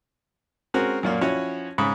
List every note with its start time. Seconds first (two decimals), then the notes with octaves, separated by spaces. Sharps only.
0.74 G#3 C4 C#4 F#4 A#4
1.03 F#2 A#2 A#3
1.21 F3 C#4 E4 F#4 C#5
1.78 G#2 C#3 B5